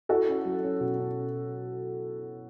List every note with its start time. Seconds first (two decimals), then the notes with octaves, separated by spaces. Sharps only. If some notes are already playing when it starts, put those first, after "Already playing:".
0.09 E4 F#4 A4
0.28 C#4
0.45 F#3
0.63 C#4
0.81 B2
0.99 C#4